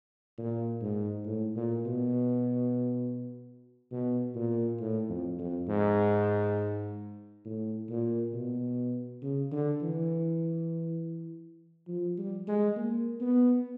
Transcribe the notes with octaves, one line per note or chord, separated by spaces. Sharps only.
A#2
G#2
A2
A#2
B2
B2
A#2
A2
F2
F2
G#2
A2
A#2
B2
C#3
D3
E3
F3
G3
G#3
A#3
B3